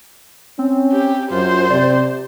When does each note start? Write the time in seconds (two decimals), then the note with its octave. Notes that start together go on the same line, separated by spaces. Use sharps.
0.59 C4 C#4
0.93 G4
1.31 F#2 F4 C5
1.70 C3 D5